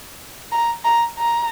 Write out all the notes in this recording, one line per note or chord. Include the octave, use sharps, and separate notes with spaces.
A#5
A#5
A#5